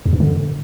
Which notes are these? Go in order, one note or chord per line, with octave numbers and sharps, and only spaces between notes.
E2
G2
D3